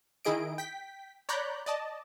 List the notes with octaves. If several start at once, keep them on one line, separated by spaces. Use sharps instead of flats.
D#3 E4 G#4 D#5 D7
G5 B6
C#5 D5 A#5 B5 F#6 G6
D5 D#5 A5